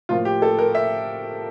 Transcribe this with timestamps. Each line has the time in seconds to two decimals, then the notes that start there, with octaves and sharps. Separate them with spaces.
0.09 A2 F3 A#3 F4
0.25 G4
0.42 A4
0.59 A#4
0.75 E5